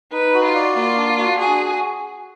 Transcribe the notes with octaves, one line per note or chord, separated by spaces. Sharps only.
D#4 B4
F#4
F4
D5
A#3 F4
D4
F#4
F#4 G#4